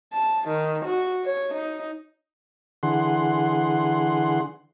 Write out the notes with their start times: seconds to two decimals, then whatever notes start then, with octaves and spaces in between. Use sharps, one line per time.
0.13 A5
0.48 D#3
0.85 F#4
1.24 C#5
1.54 D#4
2.83 D3 E3 G#4 F#5 C6